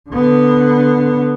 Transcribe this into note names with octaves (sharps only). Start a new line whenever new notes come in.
D3 B3